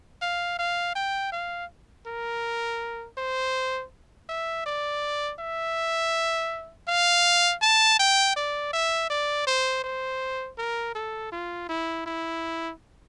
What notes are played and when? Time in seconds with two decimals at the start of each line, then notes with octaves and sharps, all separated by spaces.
0.22 F5
0.59 F5
0.95 G5
1.32 F5
2.07 A#4
3.18 C5
4.29 E5
4.66 D5
5.39 E5
6.88 F5
7.62 A5
7.99 G5
8.36 D5
8.73 E5
9.10 D5
9.47 C5
9.84 C5
10.58 A#4
10.95 A4
11.32 F4
11.69 E4
12.06 E4